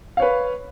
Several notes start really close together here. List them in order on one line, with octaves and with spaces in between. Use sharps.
F5 C#5 B4